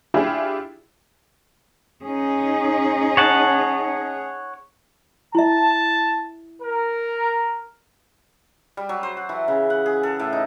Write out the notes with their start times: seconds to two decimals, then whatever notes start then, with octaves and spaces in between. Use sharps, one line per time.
0.14 D4 E4 F4 G4 G#4
2.05 C#4 D#4 G#4
3.17 C#5 F#5 A5
5.35 E4 E5 A5
6.62 A#4
8.77 G3
8.89 F#3
9.03 C5
9.17 F#5
9.29 E3
9.48 C#3
9.70 F#5
9.86 G#4
10.03 A4
10.20 A2
10.32 D#4